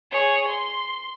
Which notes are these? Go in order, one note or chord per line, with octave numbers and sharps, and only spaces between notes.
G#4 C#5
C6